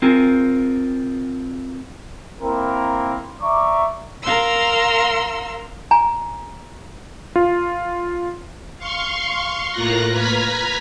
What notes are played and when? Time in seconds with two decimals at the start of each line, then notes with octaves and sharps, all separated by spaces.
0.02 C4 F4 G#4 A#4
2.40 A#3 C4 E4 A#4
3.41 D5 E5 A#5 C#6 D6
4.23 A#4 F5 A#5 C6 E6
5.91 G#5 A#5
7.36 F4
8.78 F5 C6 C#6
9.72 A2 A#3 F4 A#5 F#6 A#6
10.11 B4 A#5 F6 G#6 B6